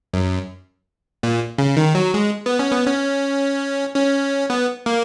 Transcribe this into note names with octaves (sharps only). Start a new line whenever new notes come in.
F#2
A#2
C#3
D#3
F#3
G#3
B3
C#4
B3
C#4
C#4
B3
A#3